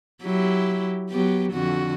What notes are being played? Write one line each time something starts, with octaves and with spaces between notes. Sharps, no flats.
F#3 E4 G4
F#3 B3 G4
F2 D3 F#4